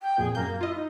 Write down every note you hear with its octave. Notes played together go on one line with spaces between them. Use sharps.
G5
F2 A#2 G#4
F#2 A#3 G6
E4 F4 D#5
D#4